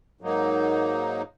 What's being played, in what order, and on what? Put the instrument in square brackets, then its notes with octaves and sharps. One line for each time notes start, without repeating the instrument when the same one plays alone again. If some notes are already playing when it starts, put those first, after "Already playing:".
[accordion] G#2 F#3 A#3 D#4